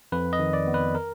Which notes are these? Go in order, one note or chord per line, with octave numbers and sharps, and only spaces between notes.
F2 B4
D#5
D#3
D5
B3
B4
A#4